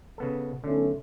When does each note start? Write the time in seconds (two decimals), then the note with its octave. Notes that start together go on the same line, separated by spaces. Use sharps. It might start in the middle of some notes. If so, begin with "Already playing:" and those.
0.18 C#3 B3 A4
0.64 B1 D3 A3 C#4